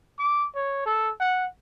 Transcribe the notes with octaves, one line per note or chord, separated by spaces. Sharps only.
D6
C#5
A4
F#5